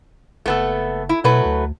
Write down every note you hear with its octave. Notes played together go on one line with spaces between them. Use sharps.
F#1 A3 B3 A4
E4
B2 F#3 A3 B4
D2